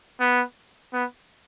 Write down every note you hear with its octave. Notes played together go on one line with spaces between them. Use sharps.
B3
B3